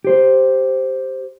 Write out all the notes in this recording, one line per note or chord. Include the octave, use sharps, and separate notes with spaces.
G4 C5